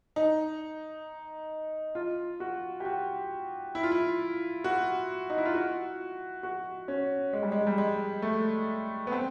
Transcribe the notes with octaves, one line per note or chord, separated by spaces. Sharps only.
D#4
F4
F#4
G4
F#4
E4
F4
E4
F#4
D#4
E4
F4
F#4
F#4
C#4
G#3
G3
G#3
G3
G#3
A3
B3
C4